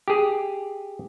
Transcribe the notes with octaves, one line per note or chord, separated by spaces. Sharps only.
G4 G#4